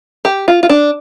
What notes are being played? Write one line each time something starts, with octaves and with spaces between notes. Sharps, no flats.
G4
F4
F4
D4